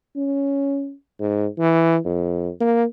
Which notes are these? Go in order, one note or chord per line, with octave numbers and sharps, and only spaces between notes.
C#4
G#2
E3
F2
A#3